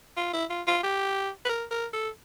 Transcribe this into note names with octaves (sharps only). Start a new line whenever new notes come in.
F4
E4
F4
F4
G4
B4
A#4
A#4
A4